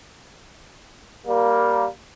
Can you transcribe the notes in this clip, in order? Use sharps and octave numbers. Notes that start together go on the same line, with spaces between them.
G3 A#3